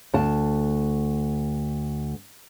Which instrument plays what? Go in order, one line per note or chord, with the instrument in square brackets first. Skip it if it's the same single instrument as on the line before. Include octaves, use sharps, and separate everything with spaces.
[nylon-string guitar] D2 A5